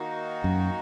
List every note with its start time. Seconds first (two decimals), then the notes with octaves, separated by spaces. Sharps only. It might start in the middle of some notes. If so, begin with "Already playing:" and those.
Already playing: D#3 A#3 D#4 F#4
0.44 F#2